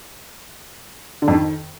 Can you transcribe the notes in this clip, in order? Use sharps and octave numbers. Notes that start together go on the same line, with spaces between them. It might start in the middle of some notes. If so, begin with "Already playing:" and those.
D3
F2
D#3